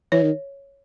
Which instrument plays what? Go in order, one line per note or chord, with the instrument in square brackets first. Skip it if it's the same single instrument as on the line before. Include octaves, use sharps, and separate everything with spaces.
[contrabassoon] E3 [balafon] C#5
[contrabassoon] D#3